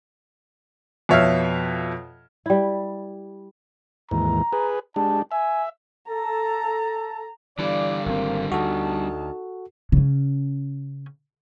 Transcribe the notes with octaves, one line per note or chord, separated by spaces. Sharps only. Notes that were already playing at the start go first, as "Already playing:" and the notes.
F2 B2 C#5 E5 F5 F6
G3 E4
D#2 G#2 E3 A#5
G#4 B4
G#3 D4 G4 A5
E5 G#5
A4 A5 A#5
D3 E3 G3 D5 F5
G#1 A#3 C4
D2 D#4 F#4 A4 A5
C#3 C#4